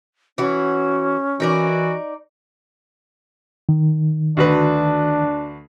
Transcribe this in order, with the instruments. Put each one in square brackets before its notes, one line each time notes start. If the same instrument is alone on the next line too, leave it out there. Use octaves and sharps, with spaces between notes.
[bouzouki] E3 F#4 [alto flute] C#4
[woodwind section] E3 F#4 [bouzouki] D#4 A#4 D5
[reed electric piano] D#3
[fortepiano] D2 F#4 B4 [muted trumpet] D4